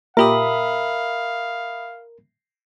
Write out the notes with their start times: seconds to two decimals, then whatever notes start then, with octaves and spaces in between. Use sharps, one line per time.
0.17 A#2 G4 A#4 E5 F5 B5 D#6